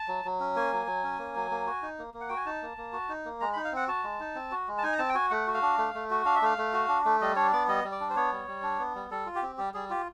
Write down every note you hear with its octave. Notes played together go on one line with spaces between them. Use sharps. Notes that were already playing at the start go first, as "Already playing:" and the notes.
Already playing: A5
F#3
F#3
C#4
A#3 G#5
F#3
F#3
C#4
A#3
F#3
A#3
F#4
D#4
A#3
A#3
F#5
F#4 G5
G#5
D#4 A5
A#3
A#3
F#4
D#4
A#3
G#3 A#5
D#4 B5
F5
C4 F#5
F#4 A5
G#3
D#4
C4
F#4
G#3
A5
D#4 G#5
A#5
C4 A5
G5
F#4 G#5
A3 F#5
F#4
F5
D4
A3
A3
F#4
D4 F5
E5
A3 F5
A3
F#4
D4
A3
G3 D#5
D4 C#5
B3 D5
G3 D#5
G3
D5
D4
C5
B3 C#5
G3
G3
D4
B3
G3
G3 A4
F4
G4
C4
G3 G4
G3 G#4
F4 G4